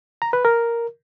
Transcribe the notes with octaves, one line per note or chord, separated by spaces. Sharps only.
A#5
B4
A#4